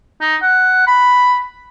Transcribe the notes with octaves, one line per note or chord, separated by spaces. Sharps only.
D#4
F#5
B5